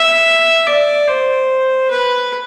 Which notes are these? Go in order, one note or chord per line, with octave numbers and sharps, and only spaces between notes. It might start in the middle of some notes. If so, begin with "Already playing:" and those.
Already playing: E5
D5
C5
B4